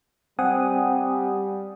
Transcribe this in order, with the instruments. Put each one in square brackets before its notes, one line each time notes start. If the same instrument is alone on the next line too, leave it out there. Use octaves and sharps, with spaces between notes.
[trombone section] G3 [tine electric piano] C4 [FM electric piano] F#5 G#5 D#6